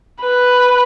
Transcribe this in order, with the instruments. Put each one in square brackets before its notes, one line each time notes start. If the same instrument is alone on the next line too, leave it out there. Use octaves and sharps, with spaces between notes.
[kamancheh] B4